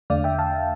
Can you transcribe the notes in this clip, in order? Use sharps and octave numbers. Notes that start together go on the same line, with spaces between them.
E2 D3 A3 D5 F5
E5 G5
F5 A5